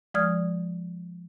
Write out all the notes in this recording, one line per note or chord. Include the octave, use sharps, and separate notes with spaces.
F3 G#3 D5 D#6 F6 G#6